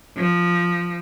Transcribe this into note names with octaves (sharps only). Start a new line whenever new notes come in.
F3